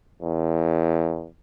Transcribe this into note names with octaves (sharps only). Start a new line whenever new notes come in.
E2